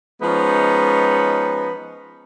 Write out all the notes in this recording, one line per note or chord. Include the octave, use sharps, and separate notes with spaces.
F3 G#3 B3 C#4 D#4